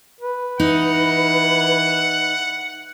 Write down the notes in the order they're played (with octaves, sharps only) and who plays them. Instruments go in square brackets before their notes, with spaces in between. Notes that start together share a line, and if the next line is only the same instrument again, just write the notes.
[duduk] B4
[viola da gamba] E3 [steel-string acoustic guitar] D#4 [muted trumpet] F#5